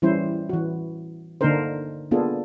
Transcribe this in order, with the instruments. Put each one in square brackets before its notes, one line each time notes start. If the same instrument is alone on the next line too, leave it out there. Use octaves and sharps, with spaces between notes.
[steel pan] E3 G3 C#4 E4 C5
E3 F#4
D3 A#3 D4 D#4 A#4 C5
A#3 B3 D4 F4 G#4 A4